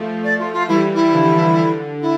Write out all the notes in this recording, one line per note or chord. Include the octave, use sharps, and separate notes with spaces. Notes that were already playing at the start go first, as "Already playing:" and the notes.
Already playing: F3 A3
D5
F4
F4
E3 G3 E4
E4
D3 F3
D3
E4